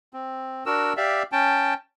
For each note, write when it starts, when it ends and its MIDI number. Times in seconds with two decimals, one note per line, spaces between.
0.13 0.64 60
0.66 0.93 62
0.66 0.93 66
0.66 0.93 70
0.66 0.93 88
0.97 1.23 67
0.97 1.23 74
0.97 1.23 76
0.97 1.23 77
1.32 1.74 61
1.32 1.74 79
1.32 1.74 81